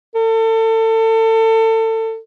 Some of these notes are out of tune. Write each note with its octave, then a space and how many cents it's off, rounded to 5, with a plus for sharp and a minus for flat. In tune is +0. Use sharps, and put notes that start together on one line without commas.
A4 +30